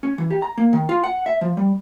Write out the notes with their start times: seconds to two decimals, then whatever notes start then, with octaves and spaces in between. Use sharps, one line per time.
0.03 C#4
0.18 E3
0.30 G4
0.42 A#5
0.58 A#3
0.73 D#3
0.89 F4
1.04 F#5
1.26 E5
1.41 F3
1.57 G3